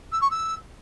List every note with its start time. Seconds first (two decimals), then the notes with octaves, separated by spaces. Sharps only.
0.12 E6
0.21 C#6
0.31 E6